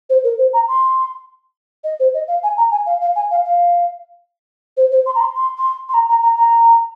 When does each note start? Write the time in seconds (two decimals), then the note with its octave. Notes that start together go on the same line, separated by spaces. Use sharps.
0.10 C5
0.24 A#4
0.38 C5
0.53 A#5
0.68 C6
1.84 D#5
2.00 C5
2.14 D#5
2.28 F5
2.43 G#5
2.57 A#5
2.72 G#5
2.86 F5
3.01 F5
3.16 G#5
3.31 F5
3.45 F5
4.77 C5
4.92 C5
5.06 C6
5.15 A#5
5.20 C6
5.35 C6
5.58 C6
5.89 C6
5.94 A#5
6.09 A#5
6.22 A#5
6.37 A#5